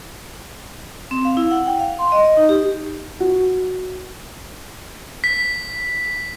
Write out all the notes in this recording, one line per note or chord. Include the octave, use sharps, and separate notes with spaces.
C4
F5
E4
F#5
G5
F5
C6
D#5
D#5
D#4
G4
F#4
B6